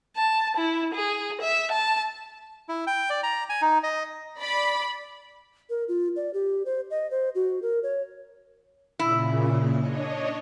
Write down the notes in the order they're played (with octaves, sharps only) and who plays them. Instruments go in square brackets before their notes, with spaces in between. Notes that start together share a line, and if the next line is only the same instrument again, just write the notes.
[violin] A5
E4
G#4
E5
A5
[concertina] E4
G5
D5
A#5
G#5
D#4
D#5
[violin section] D5 B5
[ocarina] A#4
F4
D5
G4
C5
D#5
C5
F#4
A#4
C#5
[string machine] A#2 C#3 [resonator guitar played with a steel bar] E4
[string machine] D4 C#5 D#5